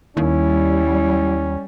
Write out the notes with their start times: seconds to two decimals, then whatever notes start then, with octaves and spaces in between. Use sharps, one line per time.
0.17 D#2 G3 C#4 E4